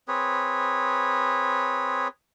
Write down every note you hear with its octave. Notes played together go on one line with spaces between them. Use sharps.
C4 G#4 B4 C#5